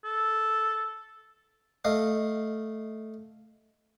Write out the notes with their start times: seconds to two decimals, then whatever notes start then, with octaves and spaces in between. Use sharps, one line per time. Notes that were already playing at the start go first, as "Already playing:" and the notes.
0.05 A4
1.85 A3 D#5 F5